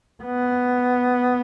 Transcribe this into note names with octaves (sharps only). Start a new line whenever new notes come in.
B3